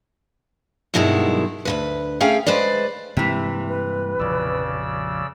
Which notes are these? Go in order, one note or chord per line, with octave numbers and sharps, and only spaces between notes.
G2 B2 D#3 F#3 G#3 E4
D2 A#2 B4
A3 C#4 G#4 F5 G5
G#3 B4 C5 D5
G2 C3 E3 G#3 A#3
B4
A#1 F2 C#3 D5 E6